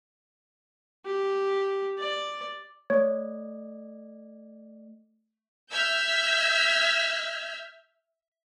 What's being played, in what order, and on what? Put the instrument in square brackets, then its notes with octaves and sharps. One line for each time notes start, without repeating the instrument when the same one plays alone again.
[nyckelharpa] G4
D5
[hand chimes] A3 D5 [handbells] C#5
[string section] E5 E6 F6 G6 G#6 B6